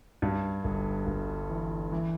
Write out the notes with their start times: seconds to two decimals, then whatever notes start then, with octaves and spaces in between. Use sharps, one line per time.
0.22 G2
0.64 G1
1.07 G1
1.50 E3
1.92 E3